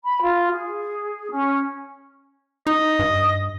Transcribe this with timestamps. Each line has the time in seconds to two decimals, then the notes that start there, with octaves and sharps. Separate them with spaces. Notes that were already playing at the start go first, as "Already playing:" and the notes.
0.03 B5
0.22 F4
0.51 G#4
1.31 C#4
2.67 D#4 D#5
2.99 G2